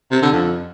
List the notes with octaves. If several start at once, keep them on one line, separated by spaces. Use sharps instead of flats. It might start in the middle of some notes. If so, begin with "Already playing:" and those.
C3
D3
F2